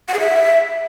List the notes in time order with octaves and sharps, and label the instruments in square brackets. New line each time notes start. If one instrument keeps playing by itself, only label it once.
[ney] F#5
G#4
E5